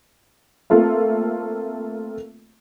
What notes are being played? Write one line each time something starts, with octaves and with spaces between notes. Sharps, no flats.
A3 A#3 C4 F4 A4 E5